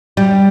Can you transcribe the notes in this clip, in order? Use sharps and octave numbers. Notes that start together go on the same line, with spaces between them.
G3